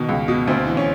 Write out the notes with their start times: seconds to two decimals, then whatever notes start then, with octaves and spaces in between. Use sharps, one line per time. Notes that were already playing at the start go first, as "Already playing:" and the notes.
Already playing: B2 D#3
0.09 C#2
0.28 B2
0.48 D2 C4
0.67 E3
0.77 C#4